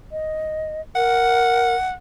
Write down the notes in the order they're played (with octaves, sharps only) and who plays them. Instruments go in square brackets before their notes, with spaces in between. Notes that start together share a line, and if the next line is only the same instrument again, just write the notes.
[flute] D#5
[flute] A#4 [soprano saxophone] F#5